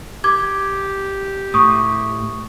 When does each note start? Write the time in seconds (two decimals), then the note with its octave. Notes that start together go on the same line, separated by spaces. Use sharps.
0.24 G4 D6 G#6
1.54 A2 C#6 D#6